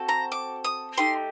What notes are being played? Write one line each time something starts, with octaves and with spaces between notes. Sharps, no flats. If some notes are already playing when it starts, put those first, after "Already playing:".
Already playing: C4 F#4 A4
A#5
D6
D#6
A3 D#4 G4 C6